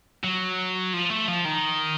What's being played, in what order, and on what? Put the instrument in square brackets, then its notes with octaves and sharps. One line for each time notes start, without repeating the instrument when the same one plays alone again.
[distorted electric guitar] F#3
F3
A3
F3
D#3